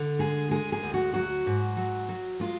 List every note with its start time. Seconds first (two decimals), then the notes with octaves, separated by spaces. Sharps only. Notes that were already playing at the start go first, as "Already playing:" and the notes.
Already playing: D3
0.19 G#3 G#4
0.51 G#3 G#4
0.72 G#4
0.83 D2
0.94 F#4
1.14 F#3 F#4
1.46 G#2
1.77 F#3
2.09 F#3
2.40 G#3 F4